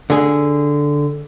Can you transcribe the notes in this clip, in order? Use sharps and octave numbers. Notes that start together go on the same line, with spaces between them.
D3 G#4